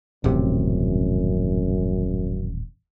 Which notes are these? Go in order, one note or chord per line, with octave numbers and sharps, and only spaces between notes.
D#1 A1 F#2 C3